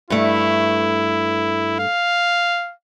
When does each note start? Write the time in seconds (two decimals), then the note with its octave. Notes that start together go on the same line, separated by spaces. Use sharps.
0.10 G2 A3 E4
1.79 F5